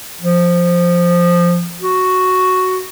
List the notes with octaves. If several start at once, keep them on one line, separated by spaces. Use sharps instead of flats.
F3
F#4